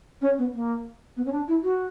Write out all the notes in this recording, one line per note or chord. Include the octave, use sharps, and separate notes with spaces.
C#4
B3
A#3
B3
C#4
D4
E4
F#4